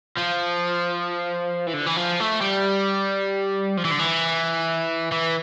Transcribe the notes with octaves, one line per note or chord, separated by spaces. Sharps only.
F3
E3
D3
E3
F3
A3
G3
F3
E3
D3
E3
E3